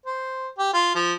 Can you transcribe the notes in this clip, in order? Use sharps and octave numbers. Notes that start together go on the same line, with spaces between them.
C5
G4
F4
F3